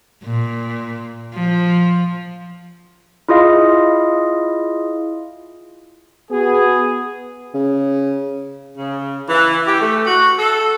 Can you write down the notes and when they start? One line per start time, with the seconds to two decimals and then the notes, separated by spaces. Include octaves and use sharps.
0.24 A#2
1.34 F3
3.29 E4 F4 G#4 D#5 F5
6.31 B3 F#4 G#4
7.54 C#3
8.77 C#3
9.29 E3
9.67 G4
9.80 A3
10.07 F#4
10.38 A4